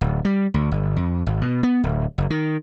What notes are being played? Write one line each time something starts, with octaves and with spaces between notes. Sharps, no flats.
D1
G3
D2
G1
F2
G#1
B2
B3
D1
F#1
D#3